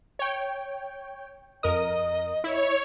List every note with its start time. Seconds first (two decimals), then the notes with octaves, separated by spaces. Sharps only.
0.19 C#5 G5
1.63 F2 A#4 D#5 D#6
2.44 E4 C#5